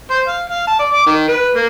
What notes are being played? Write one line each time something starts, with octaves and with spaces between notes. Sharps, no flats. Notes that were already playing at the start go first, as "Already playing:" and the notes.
C5
F5
F5
A5
D5
D6
D#3
B4
A#3